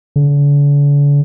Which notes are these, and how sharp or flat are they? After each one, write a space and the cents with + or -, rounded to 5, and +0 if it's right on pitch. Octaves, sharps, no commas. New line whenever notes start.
D3 -40